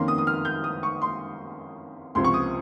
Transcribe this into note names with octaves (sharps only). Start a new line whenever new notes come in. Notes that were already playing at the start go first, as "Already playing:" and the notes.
Already playing: F2 D#3 A#3 C#4 C6
D#6
D#6
F6
G6
D#6
C#6
C6
C#2 C3 F3 C6
C#6
D#6